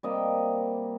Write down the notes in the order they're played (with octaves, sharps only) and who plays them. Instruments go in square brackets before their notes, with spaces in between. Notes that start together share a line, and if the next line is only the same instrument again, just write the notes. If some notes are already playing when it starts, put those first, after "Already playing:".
[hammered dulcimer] C3 G3 A#3 D#5 G5